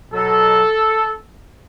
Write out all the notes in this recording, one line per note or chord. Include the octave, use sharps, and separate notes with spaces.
B2 F#3 A4